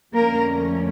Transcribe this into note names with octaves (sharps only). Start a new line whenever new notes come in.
F2 D3 A3 A#3 C#4 A#4